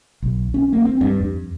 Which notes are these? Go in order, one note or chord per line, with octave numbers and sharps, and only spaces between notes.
B1
C#4
A#3
C4
G2
F2